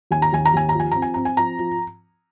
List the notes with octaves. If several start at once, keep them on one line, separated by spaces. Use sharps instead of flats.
D#2 G#5
A#5
D#2 G#5
A#5
D#2 G#5
A#5
F3
G#5
C4 A#5
G#5
C4 A#5
G#5
F3 A#5
F3